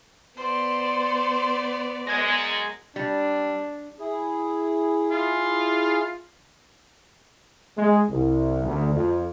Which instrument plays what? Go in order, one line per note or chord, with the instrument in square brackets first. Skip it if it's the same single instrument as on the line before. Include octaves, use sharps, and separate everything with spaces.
[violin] B3 D5 [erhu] C5
[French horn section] F#2 G#3 [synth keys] G#6 A#6
[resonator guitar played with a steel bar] G3 [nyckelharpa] D4
[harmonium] E4 G#4
[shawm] F4
[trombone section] G#3
C2
D2
F2